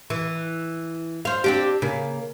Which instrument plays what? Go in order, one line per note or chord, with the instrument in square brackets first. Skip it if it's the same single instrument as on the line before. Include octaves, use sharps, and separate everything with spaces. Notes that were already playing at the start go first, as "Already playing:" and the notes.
[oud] E3
C5 F5
C4 D4 G4
C#3 A#3